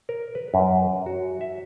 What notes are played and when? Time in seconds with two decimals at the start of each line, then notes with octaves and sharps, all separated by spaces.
0.09 A#4
0.35 B4
0.54 F#2
1.06 F#4
1.41 E5